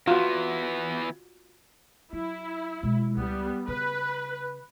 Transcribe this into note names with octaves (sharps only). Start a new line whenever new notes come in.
E3 B3 F4 F#4
F#3 E4
B2 G#3
C#2 G3 B3
C#3 B4